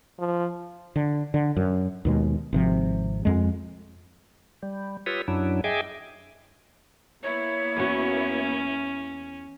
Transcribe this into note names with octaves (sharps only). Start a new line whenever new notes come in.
F3
D3
D3
F#2
D#2 B2 G#3
G#1 C3 F3
F2 G#3
G3
F4 G4 B4 C#5 D#6 E6
F#2 F#3 D4 E4
G#4 D#5 E5 G5 G#5 D6
A#3 B3 E4 C#5
E2 C#4 F#4